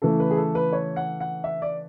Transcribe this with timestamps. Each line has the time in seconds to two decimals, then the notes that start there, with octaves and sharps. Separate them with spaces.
0.02 C#3 E3 A3 A4
0.20 B4
0.31 G#4
0.37 A4
0.55 B4
0.73 C#5
0.96 F#5
1.20 F#5
1.44 E5
1.62 D5